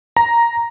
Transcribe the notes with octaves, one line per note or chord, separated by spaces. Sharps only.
A#5